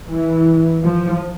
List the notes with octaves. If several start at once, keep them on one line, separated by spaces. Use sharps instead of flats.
E3
F3